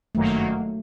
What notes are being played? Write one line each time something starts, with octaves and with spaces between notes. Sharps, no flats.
G1 F#2 D#3 F#3 A3 A#3